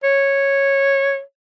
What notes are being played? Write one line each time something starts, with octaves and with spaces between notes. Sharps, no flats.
C#5